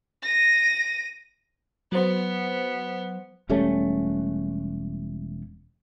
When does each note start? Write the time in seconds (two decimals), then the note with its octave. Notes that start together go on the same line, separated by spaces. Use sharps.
0.23 A#6 D#7
1.92 F#3 B3 C5
3.49 E1 G3 A3 C#4